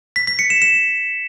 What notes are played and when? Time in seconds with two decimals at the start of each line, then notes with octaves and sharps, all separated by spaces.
0.16 B6
0.27 B6
0.39 C#7
0.50 E7
0.62 E7